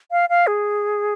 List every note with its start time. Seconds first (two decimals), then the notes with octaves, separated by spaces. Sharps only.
0.11 F5
0.30 F5
0.47 G#4